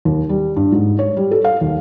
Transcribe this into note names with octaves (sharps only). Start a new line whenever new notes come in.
D#2
G3
G2
G#2
C#5
G3
A4
F5
D#2